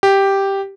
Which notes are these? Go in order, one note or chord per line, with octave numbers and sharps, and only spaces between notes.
G4